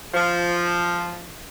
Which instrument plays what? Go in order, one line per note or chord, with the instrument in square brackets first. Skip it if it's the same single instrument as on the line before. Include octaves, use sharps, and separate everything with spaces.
[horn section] F3